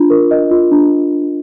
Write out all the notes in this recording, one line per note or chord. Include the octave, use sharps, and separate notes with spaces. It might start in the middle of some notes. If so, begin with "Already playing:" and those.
Already playing: D4 F4
A#4
D#5
F4
D4